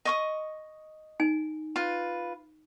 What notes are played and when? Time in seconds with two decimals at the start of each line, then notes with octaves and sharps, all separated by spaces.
0.05 D#5 C#6 D#6
1.20 D#4 G#5
1.76 F4 B4